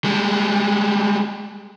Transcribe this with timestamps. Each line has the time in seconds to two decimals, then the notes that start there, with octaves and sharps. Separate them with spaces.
0.04 G3 G#3